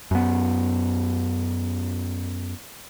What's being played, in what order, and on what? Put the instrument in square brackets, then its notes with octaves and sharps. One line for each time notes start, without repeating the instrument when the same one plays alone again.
[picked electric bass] F#2 B3